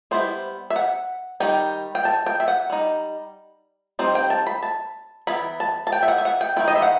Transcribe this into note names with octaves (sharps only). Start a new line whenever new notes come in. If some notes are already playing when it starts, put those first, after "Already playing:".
G3 B3 E4 C5
E5
F#5
D#3 G3 D#4 G5
G5
A5
G5
E5
F#5
G3 D#4
G3 C4 D#4 C5
G5
A5
B5
A5
E3 B3 E4 B5
A5
A5
G5
E5
F#5
E5
F#5
G5
D#3 A3 E4 G5
D#5
E5
F#5